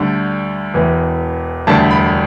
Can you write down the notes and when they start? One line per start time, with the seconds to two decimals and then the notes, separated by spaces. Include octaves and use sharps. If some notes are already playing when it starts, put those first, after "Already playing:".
Already playing: D2 D3 G3
0.74 E1 E2 E3
1.67 E1 D2 D3 G3 A5
1.90 B5